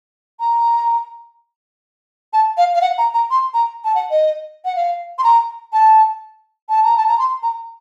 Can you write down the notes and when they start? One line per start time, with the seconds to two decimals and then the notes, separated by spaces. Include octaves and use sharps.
0.40 A#5
2.33 A5
2.57 F5
2.75 F5
2.82 F#5
2.98 A#5
3.14 A#5
3.31 C6
3.54 A#5
3.85 A5
3.95 F#5
4.11 D#5
4.65 F#5
4.76 F5
5.18 C6
5.24 A#5
5.73 A5
6.69 A5
6.84 A#5
6.97 A5
7.09 A#5
7.19 C6
7.43 A#5